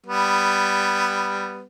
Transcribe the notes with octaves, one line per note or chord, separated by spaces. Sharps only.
G3 B3